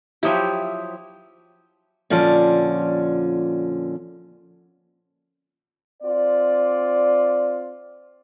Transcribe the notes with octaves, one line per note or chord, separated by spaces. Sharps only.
F3 F#3 E4 G4 E5 D#6
A#2 D3 F3 C#4 D5
C4 F4 D5